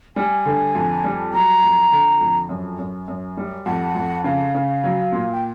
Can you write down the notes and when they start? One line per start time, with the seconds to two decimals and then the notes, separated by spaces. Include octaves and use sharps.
0.16 G3 G#5
0.46 D3
0.75 F2
1.04 G3
1.33 F#3 A#5
1.62 F2
1.92 D3
2.21 F2
2.49 F#2
2.79 F#2
3.08 F#2
3.37 G3
3.66 F2 F#5
3.95 F2
4.24 C#3 F5
4.55 C#3
4.84 F#3
5.12 A#2
5.33 G5